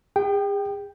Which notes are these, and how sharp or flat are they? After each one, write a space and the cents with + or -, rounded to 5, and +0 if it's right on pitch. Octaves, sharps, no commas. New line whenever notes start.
G#4 -45 G5 +0